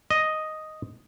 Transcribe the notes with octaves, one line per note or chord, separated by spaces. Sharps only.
D#5